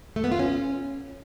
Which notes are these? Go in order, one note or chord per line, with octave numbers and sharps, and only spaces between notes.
A3
B3
F4
C#4